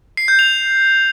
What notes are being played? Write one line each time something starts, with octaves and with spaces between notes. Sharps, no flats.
C7
G6
F7